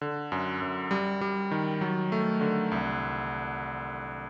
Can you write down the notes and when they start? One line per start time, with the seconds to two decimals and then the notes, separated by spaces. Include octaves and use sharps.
0.01 D3
0.32 F#2
0.62 F#2
0.91 G3
1.21 G3
1.51 D#3
1.81 F#3
2.12 A3
2.41 D3
2.72 C2